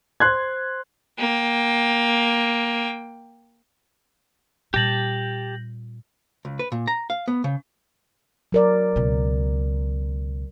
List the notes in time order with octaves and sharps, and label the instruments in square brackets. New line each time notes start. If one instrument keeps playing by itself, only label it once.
[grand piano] C5 C6 F#6 G#6
[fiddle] A#3 G5
[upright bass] A#2 G3 [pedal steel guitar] G4 A5 [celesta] G6 A#6 F#7
[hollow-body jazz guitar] C#2
B4
A#2
A#5
F5
B3
C#3
[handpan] F#3 A#4 D5
[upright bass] C#2 B2